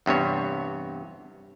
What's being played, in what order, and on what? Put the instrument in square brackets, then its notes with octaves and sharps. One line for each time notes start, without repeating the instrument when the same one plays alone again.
[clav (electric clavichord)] E2 G2 C3 C#5